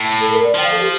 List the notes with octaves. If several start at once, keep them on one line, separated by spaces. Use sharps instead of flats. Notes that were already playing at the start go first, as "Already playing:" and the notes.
Already playing: A2
A4
A#4
D5
F3 G5
F5
A4
G4